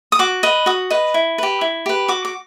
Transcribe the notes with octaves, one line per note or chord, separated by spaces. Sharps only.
D#6
F#4 D6
B4 D#5
F#4 D#6
B4 D#5
E4
G4 B4
E4
G4 B4
F#4 D6
D6